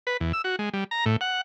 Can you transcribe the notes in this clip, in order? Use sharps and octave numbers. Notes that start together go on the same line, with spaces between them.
B4
E2
E6
F#4
G#3
G3
A#5
A2
F#5